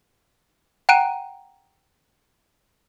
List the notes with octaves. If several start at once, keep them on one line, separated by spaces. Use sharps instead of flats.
F#5 G5 A#5 F#6 D7 D#7